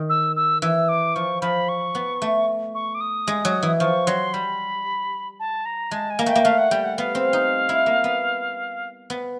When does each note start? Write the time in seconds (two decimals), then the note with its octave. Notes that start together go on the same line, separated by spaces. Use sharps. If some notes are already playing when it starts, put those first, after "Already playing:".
Already playing: D#3
0.09 E6
0.36 E6
0.62 E3 E6
0.89 D6
1.15 F3 C#6
1.42 F3 B5
1.69 C#6
1.95 B3
2.22 A3
2.75 C#6
2.95 D6
3.01 D#6
3.27 G#3
3.45 F#3
3.63 E3
3.80 F3 C#6
4.07 F#3 C6
4.33 G3 B5
5.40 A5
5.65 A#5
5.91 G#3 A5
6.10 G#5
6.19 A#3
6.26 A3 G5
6.36 A#3
6.45 A3 F5
6.58 F#5
6.71 G3 G5
6.85 F#5
6.98 B3 F5
7.15 C4
7.33 D#4
7.69 E4
7.86 A#3
8.04 B3
9.10 B3